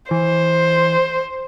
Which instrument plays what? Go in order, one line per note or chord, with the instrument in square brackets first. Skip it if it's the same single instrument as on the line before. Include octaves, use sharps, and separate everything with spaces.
[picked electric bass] E3 [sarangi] C5